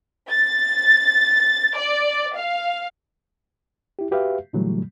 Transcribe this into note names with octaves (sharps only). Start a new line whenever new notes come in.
A6
D5
F5
E4 G4
F#4 G4 B4 E5 F5
A#2 D3 E3 F#3 G3 A3